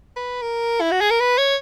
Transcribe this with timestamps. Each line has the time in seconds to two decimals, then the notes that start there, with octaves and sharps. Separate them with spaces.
0.16 B4
0.42 A#4
0.81 E4
0.91 F#4
1.01 G#4
1.10 A#4
1.20 B4
1.38 C#5